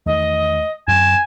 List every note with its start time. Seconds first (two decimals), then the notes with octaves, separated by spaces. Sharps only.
0.06 E2 D#3 A3 D#5
0.88 F#2 C4 G#5 E7